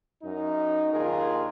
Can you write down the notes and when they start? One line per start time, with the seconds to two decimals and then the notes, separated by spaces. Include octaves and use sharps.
0.23 F#2 D#4
0.93 A#1 D#2 F4 G#4 A#4